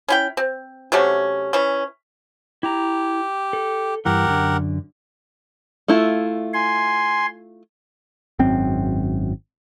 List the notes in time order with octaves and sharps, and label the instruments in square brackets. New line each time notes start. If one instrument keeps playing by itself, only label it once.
[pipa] C#4 E4 G5
C4
C3 F#3 A3 C#4
E3 C#4
[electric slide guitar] E4 A#5 [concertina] G4
[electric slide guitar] A4
[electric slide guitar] G2 E3 [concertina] G4 A#4 F#5
[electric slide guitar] F#2 D3
[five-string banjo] A3 E4 F4
[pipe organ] G#5 C6
[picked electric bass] G#1 F#2 C4